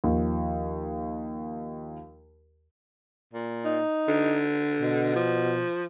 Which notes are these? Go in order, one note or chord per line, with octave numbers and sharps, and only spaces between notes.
D#2 F3
A#2
D#4
D3
B2
F3